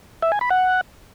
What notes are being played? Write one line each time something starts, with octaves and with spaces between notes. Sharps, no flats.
E5
G#5
B5
F#5